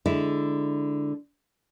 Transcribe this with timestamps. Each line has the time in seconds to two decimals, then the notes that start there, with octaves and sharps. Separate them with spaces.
0.06 D3 G#3 E4